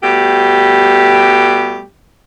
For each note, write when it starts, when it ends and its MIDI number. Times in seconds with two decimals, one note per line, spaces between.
0.02 1.82 47
0.02 1.82 55
0.02 1.82 57
0.02 1.82 67